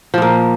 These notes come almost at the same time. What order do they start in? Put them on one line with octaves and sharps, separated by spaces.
F3 A#2 A#3